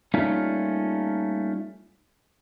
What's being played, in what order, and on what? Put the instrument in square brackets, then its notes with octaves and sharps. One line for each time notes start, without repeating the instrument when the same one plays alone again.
[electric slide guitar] G3 A3 A#3 C#4 D#4 F4